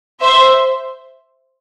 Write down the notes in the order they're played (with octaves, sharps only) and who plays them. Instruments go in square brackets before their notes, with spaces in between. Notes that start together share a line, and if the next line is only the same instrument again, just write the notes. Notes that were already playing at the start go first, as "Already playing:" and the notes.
[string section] C5 E5